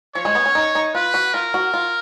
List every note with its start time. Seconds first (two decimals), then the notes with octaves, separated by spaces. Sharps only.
0.15 F3 C#5
0.25 G#3
0.35 B3
0.46 C#4
0.55 D#4
0.75 D#4
0.95 F4 B4
1.14 F#4
1.34 F4 A#4
1.54 F#4
1.74 F4